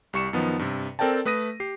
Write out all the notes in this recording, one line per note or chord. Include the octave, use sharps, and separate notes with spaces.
C2 G3 C#6 C#7 E7
F#2 D#3 F3 B3 D#4
G2 C3
C4 A4 A#4 D5 G5 A5
A3 B4 D#6 A#6 D#7
G4 C7